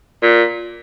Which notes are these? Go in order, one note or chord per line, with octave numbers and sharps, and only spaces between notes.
A#2